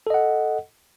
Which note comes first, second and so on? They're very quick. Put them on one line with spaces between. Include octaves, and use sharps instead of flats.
A4 D#5 F#5